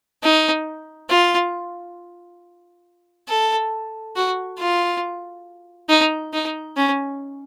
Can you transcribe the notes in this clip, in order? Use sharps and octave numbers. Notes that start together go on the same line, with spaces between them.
D#4
F4
A4
F#4
F4
D#4
D#4
C#4